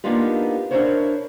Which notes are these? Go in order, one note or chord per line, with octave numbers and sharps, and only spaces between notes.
A#3 B3 D4 D#4 F4 G4
D4 E4 F4 A#4 C5 C#5